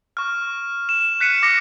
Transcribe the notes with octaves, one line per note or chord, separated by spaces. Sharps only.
C#6 F6
E7
F#6 B6 C#7 D#7 E7
D6 A#6 C#7